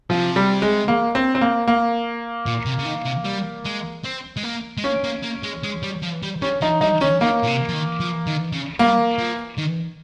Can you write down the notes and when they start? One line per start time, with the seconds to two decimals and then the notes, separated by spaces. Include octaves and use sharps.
0.10 C3 F3
0.36 G3
0.62 G#3
0.88 A#3
1.15 C4
1.35 C4
1.41 A#3
1.68 A#3
2.46 A#2
2.66 C3
2.79 C#3
2.85 D#3
3.05 C3
3.25 G3
3.65 G#3
4.04 C4
4.37 G#3
4.44 A#3
4.78 G#3
4.84 A#3 C#4
5.04 A#3
5.23 A#3
5.43 G#3
5.63 G#3
5.83 G3
6.03 F3
6.23 G3
6.42 G3 C#4
6.61 F3 D#4
6.81 G3 D#4
7.01 D#3 C#4
7.21 D#3 A#3
7.43 A#2
7.47 C3
7.69 F3
7.73 D#3
8.00 F3
8.27 D#3
8.53 C#3
8.79 G3 A#3
9.19 F3
9.58 D#3